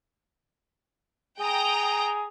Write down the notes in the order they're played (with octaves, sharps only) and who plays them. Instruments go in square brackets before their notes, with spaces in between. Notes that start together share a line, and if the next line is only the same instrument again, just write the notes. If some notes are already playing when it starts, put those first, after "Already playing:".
[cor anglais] G#4 [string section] G5 A#5 D#6